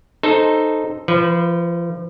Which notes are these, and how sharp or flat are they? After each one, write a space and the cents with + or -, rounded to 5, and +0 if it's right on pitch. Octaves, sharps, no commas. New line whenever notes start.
D#4 -10 A4 +0 C5 +0
F3 -30 B4 +0